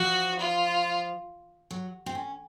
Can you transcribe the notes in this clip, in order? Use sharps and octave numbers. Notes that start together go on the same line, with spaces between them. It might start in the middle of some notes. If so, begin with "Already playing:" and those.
Already playing: F3 F#4
F4
F#3
C4
C#4